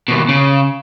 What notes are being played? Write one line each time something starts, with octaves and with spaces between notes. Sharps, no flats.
D#2 B2
C#3